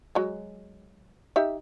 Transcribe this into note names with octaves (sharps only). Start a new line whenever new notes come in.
F#3 G#3
D#4 G4 E5